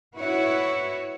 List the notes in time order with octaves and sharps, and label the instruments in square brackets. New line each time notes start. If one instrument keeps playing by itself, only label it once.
[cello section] E4 F#4 B4 C#5